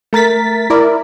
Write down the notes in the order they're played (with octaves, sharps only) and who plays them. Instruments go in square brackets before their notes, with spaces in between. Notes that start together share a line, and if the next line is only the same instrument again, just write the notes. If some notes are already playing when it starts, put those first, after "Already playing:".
[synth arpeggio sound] A3 A#4 A6 B6
E4 A#4 D5